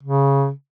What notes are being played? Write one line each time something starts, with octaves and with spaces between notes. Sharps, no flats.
C#3